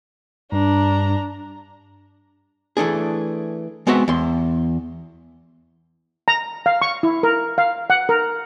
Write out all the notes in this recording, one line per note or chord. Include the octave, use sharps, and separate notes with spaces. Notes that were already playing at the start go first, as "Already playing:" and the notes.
G2 D4 A#5
E3 A3 D4 G#4
G#3 B3 C4 F#4 D#5 E5
E2 C6
A#5
F5
C#6
E4
A#4
F5
F#5
A#4